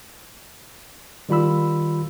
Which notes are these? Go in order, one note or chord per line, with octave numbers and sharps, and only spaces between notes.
D#3 G3 F4 B5 E6